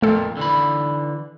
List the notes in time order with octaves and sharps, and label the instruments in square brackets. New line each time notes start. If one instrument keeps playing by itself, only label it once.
[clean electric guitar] F2 A#2 [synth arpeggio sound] A3 A4
[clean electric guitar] D3 E3 B5